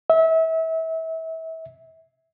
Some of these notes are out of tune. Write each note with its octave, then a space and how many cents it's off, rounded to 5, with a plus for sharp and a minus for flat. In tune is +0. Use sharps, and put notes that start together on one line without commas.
E5 -30